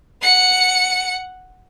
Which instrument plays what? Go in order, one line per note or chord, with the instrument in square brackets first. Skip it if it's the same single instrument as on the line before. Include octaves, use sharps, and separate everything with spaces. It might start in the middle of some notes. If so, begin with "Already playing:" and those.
[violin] F#5 C#7